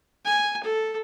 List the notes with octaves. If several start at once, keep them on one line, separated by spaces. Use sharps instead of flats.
G#5
A4